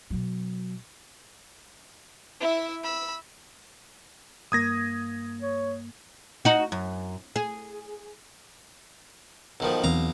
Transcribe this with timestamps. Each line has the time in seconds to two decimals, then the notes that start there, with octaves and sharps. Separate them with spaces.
0.10 B2 F#3
2.40 E4 E5
2.84 B5 E6
4.52 G2 A#3 D#6 G#6 A#6
5.42 C#5
6.45 D#4 F#4
6.72 F#2
7.36 G#4
9.60 B1 D#3 F3
9.84 B1 E2 E3 C4 F5 A#5